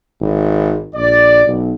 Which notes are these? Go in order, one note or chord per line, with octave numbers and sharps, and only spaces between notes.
G#1
A#1 D5
B1